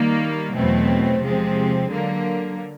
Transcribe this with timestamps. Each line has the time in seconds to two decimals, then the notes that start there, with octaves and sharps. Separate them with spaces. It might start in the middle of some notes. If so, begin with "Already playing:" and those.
Already playing: D#3 G3 A#3
0.54 E2 B2 F#3 A3 C4
1.22 C3 F3 G#3 C4
1.91 D3 F#3 A#3